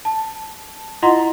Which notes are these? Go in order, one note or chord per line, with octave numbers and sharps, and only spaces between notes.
A5
E4 F4 D#5 F#5 A#5 C6